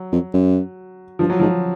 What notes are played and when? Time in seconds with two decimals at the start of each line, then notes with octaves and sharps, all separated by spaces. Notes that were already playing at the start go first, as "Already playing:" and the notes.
Already playing: F#3
0.12 F2
0.34 F#2
1.19 G2 F3
1.30 F#3
1.40 G#2 F3